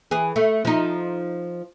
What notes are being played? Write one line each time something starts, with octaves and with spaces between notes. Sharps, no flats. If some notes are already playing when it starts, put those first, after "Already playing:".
E3 G#4
A3
F3 D#4